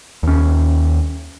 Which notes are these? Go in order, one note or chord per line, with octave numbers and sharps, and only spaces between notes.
D#2 C#4